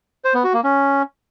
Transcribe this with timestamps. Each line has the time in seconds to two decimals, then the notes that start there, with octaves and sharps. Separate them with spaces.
0.25 C5
0.34 B3
0.44 F#4
0.54 A#3
0.64 C#4